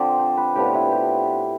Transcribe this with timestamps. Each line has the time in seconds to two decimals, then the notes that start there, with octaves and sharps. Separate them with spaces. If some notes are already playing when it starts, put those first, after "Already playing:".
Already playing: D3 F3 C4 D5
0.19 C5
0.37 B4
0.55 A2 F3 B3 D4 G4
0.66 D4
0.74 E4
0.92 G4